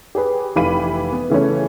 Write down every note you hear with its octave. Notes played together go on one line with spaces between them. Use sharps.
G4 G#4 B4
F1 E3 G4 F5 B5 D#7
B3
C#3 E3 A3 C#4